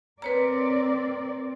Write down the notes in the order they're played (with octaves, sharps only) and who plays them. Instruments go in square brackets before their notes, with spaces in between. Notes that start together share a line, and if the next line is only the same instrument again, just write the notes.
[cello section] C4 A#4 D5 [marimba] B4 C#5 A#5